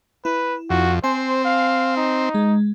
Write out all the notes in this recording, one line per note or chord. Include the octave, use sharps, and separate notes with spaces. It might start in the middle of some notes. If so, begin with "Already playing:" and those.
E4 B4
F2 F#4
C4 C5 G#5
F5
D#4
G#3